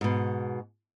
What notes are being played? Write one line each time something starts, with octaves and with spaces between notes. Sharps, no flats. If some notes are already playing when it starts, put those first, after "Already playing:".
G#2 B2